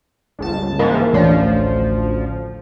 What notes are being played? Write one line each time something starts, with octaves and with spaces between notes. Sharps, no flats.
G1 C#2 A5
G#2 E3 F3 A#3
A1 D2 F3 C#4 D4